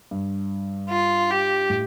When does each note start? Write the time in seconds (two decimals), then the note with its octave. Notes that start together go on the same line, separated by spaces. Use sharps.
0.11 G2
0.90 F4
1.31 G4
1.70 A2